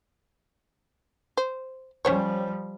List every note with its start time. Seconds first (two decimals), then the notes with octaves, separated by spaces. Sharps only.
1.37 C5
2.05 F3 G3 C#4 C5 C#5